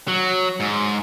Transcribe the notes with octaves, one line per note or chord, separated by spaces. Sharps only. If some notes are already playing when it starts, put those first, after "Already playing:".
F#3
G#2